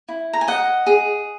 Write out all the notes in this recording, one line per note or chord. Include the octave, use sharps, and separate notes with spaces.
E4
A#5
G#5
D#5 F#5
G#4